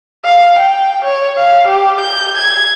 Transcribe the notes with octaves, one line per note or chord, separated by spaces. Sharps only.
F5
G5
C#5
F5
G4
G6
G#6